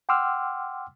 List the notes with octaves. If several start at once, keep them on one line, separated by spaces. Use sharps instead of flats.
F#5 G5 C6 D6 E6 F6